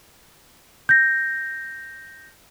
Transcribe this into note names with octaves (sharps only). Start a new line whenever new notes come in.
G6 A#6